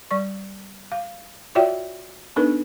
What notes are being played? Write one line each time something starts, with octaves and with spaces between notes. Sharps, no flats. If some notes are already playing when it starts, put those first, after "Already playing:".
G3 D5 C#6
F5
F4 F#4 C#5 D5 E5 G5
B3 D4 D#4 A4 B4